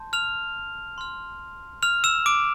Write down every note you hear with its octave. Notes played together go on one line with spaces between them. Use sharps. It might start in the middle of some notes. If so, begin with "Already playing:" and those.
Already playing: A5 C6 G6
F6 F7
C6 F6
F6 F7
E6 E7
D6 D7